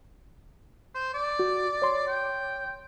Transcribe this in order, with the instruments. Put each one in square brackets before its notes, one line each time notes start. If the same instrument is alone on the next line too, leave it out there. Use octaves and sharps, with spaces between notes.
[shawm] C5
D5
[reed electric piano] F#4
C#5 C6
[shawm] G5